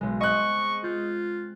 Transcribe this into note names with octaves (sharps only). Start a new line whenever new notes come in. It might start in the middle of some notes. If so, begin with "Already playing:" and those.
B1 G#3
C4 D#5 C#6 F#6
F4 G6